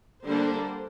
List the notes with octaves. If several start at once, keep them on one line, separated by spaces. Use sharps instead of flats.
D3 G3 A#3 D4 C5